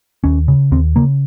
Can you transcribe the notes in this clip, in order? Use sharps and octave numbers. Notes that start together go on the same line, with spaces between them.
D#2 C#4
C#3
D#2 C4
C#3 A#3